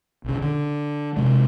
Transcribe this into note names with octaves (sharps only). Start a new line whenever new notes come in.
B1 C#3
D3
C3 G#3